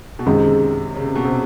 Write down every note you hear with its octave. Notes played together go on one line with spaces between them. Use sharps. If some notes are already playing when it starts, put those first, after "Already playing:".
B2
F#2 C3 D#3 G#3
C#3
C3
B2
C3